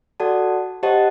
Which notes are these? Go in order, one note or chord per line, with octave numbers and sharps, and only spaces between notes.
F#4 A4 D5 F#5 A5
G4 C5 D#5 F#5 A5